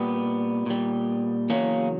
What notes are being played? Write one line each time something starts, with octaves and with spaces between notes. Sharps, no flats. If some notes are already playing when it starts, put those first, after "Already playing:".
Already playing: A#2 G3 B3
A#2 G3
E2 C#3 F#3 A#3 C#4